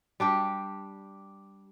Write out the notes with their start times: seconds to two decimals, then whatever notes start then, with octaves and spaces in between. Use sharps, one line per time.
0.20 G3 D4 G4